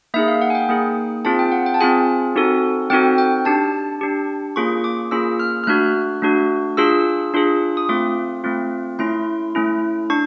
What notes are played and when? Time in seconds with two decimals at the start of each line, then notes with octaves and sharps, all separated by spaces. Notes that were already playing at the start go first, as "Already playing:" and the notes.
0.14 A#3 D#4 G#4 E5
0.28 F5
0.41 F#5
0.50 G#5
0.55 G5
0.69 A#3 D#4 G#4
1.25 C4 F4 G#4 A5
1.39 G5
1.52 F#5
1.66 G5
1.74 A5
1.81 C4 F4 G#4 G#5
2.36 C4 D#4 F#4 A4
2.90 C4 D#4 F#4 A4 G5
3.18 G5
3.45 D4 G4 A5
4.01 D4 G4
4.56 A#3 C#4 F4 G#4 C#6
4.84 D6
5.11 A#3 C#4 F4 G#4 E6
5.39 F6
5.64 F6
5.67 A3 D4 F#4 F#6
6.22 A3 D4 F#4
6.77 D4 F4 G#4 E6
7.34 D4 F4 G#4
7.77 D#6
7.89 A3 C4 F4 D6
8.44 A3 C4 F4
8.99 A3 C#4 E4 C6
9.55 A3 C#4 E4
10.10 D4 C#6